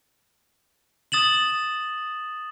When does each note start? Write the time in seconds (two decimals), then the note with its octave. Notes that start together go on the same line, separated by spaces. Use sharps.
1.12 D#6 A6 E7 F#7